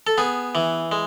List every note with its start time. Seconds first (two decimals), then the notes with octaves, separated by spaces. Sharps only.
0.07 A4
0.18 B3 G#4
0.55 E3
0.92 G#3